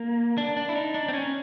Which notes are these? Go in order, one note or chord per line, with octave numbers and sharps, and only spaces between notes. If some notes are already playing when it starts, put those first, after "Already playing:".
Already playing: A#3
D4
D4
E4
D#4
D4
C4
C#4